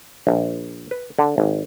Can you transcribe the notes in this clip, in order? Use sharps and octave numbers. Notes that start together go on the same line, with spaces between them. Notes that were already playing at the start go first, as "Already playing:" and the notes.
A#1
B4
D3
G#1